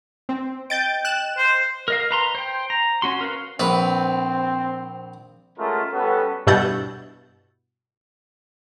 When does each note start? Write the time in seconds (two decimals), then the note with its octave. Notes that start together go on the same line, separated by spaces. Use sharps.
0.29 C4
0.70 D#5 G5 G6 A6 D7
1.05 F#6 E7
1.37 C5
1.88 A#4 D#5 F5
2.11 B4 A#5 C6
2.35 C5 G5
2.70 A#5
3.02 C#4 F#4 C6
3.21 A#4 B4 F5
3.60 A#1 C4 B4
5.58 G#3 A3 C#4 F4 F#4 A#4
5.92 G3 B3 C#4 F#4 A4
6.47 G2 B2 E4 F#5 G6 A6